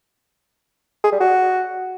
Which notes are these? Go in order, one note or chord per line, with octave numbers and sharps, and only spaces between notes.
G#4
G3
F#4